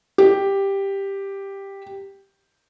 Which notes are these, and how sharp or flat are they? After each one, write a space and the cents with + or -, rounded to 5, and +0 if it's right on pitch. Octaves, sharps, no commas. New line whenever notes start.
G4 +5